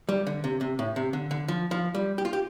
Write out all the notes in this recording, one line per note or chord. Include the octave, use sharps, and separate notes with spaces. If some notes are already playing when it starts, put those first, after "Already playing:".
G3
D3
C3
C3
A2
C3
D3
D3
F3
F3
G3
G4
F4
G4